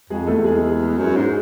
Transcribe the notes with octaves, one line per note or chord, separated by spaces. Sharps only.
F2 G#3 G#4
E2 A3 A4
G#3 G#4
F#2
G#2